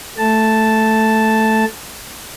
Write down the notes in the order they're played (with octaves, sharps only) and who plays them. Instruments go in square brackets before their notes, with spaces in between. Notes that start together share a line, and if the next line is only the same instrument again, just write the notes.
[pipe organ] A3 A5